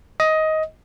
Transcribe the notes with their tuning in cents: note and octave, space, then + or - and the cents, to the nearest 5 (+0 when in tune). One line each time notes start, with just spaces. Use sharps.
D#5 +15